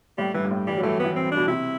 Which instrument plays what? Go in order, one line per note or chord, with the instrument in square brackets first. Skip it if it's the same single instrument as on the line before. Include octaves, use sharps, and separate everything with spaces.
[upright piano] A2 [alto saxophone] G3
[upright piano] G2 [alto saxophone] E3
[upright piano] G2
A2
[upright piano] E3 [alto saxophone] G3
[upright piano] F#3
[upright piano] E3 [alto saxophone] A3
[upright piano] E3 [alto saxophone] B3
[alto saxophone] C4
D4
[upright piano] B2
[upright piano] C3 [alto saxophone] E4